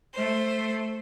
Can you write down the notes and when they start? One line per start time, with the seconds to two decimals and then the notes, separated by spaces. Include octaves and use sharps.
0.13 A3 C5